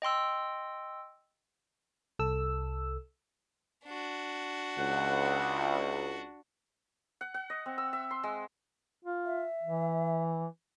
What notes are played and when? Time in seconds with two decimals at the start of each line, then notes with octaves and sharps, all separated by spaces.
0.02 D#5 G5 C6 E6
2.19 C2 A4 E6
3.85 D4 F#4
4.77 C#2 F#5
7.21 F#5
7.34 F#5
7.50 D#5
7.66 C4
7.78 E6
7.93 E5
8.11 C6
8.23 G#3
9.05 F4
9.26 E5
9.63 E3